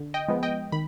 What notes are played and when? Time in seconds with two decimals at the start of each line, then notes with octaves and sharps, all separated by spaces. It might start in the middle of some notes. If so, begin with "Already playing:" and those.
Already playing: D3
0.14 D#5 G5
0.28 F3 G#3 B3
0.43 D#5 G5
0.72 D#3 B5